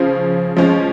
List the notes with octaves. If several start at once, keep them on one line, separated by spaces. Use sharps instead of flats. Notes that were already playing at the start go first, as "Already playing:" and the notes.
Already playing: C#3 F3 C#4 C5
F3 G#3 C#4